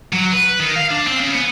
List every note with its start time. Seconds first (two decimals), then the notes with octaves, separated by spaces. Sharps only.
0.13 F#3
0.32 B4
0.59 D#3
0.76 F5
0.91 D4
1.07 C4
1.20 C#3
1.35 B3